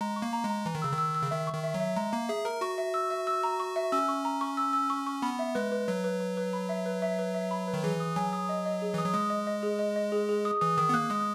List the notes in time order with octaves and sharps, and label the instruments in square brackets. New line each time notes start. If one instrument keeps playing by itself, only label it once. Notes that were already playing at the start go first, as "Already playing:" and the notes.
[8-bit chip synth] G#3 [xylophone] A#5
[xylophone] C#6
[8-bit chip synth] A#3
[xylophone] A#5
[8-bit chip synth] G#3
[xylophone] A#5
[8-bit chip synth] E3 [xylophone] A#5
[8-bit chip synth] D#3
[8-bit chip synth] C#3 [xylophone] E6
[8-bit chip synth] D#3 [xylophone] E6
[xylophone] E6
[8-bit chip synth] C#3
[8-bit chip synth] D#3 [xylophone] E5
[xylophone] C#6
[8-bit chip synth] D#3
[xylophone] E5
[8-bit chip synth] F#3
[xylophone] E5
[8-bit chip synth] G#3 [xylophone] A#5
[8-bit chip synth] A#3 [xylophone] A#5
[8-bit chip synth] G#4 [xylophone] E5
[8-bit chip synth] A#4 [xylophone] A#5
[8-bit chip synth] F#4 [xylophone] C#6
[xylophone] E5
E6
E5
E6
A#5
C#6
E5
[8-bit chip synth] C#4 [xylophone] E6
[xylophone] C#6
A#5
C#6
E6
E6
C#6
C#6
[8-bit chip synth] B3 [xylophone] B5
[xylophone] E5
[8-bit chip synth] G#3 [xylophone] B4
[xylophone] B4
[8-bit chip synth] F#3 [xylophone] B4
[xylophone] B4
B4
B4
B5
E5
B4
E5
B4
E5
B5
B4
[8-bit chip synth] D#3
[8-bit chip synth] E3 [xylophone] G#4
[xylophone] D#6
[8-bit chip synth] F#3 [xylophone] G#5
[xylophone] D#6
D#5
D#5
G#4
[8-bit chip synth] E3 [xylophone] D#6
[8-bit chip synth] F#3
[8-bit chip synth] G#3 [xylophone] D#6
[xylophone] D#5
D#5
G#4
D#5
D#5
G#4
G#4
D#6
[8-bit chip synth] E3 [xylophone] D#6
[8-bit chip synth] D#3 [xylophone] D#6
[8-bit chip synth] B3
[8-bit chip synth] A#3 [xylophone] F#6
[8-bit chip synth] G#3 [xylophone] D#6